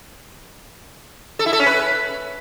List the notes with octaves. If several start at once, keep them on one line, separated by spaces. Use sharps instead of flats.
A4
E4
A4
C#4
B4